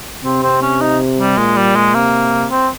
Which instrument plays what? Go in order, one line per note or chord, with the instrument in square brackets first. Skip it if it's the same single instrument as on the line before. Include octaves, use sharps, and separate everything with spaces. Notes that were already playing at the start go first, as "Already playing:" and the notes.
[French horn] C3 [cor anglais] C4
[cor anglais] C4
C#4
D#4
G3
[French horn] A#2 [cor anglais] G#3
[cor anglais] G3
G#3
[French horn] C3 [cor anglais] A#3
[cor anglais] C4